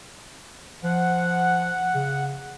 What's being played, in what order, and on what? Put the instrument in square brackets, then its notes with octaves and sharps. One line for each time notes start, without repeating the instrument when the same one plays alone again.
[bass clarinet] F3 [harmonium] F#5
[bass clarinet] C#3